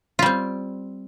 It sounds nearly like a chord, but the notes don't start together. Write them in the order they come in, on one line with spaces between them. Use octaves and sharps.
F4 G3 C4